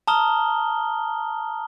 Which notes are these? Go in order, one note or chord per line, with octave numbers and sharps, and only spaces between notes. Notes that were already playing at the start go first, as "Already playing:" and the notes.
A5 A#5 D#6 F6 G7